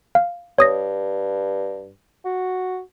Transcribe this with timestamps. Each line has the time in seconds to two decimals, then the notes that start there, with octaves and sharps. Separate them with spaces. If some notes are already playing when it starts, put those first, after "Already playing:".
0.15 F5
0.58 G2 C#5 D#6 A#6
2.25 F#4